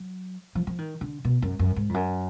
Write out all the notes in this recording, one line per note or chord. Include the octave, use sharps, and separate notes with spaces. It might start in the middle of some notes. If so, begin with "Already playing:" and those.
Already playing: F#3
F3
F3
D#3
D3
B2
F#2
F#2
G#2
F2
F#2